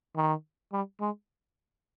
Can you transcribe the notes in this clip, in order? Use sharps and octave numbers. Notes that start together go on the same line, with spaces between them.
D#3
G3
G#3